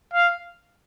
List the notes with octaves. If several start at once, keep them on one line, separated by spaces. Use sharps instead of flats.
F5